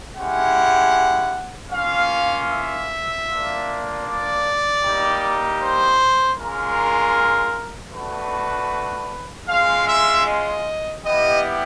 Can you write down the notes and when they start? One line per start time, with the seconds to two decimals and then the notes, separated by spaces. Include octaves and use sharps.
0.15 G#3 C#4 E4 G4 F#5
1.70 A#3 C#4 F4 F5
2.48 E5
3.26 A#3 D4 F4
4.04 D5
4.82 G3 A#3 D#4 G4
5.60 C5
6.37 G#3 C#4 F4 A#4
7.92 A3 D4 F#4 B4
9.48 G#3 C#4 F4 F5
9.87 E5
10.25 D#5
11.03 G3 B3 E4 G4 D#5